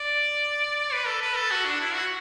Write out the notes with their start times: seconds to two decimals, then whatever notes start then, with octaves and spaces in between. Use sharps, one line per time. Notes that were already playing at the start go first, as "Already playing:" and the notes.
Already playing: D5
0.93 B4
1.07 A4
1.22 B4
1.37 A4
1.51 F#4
1.65 D4
1.81 E4
1.94 F#4